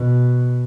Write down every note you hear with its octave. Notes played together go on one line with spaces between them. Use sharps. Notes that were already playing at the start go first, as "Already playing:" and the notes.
Already playing: B2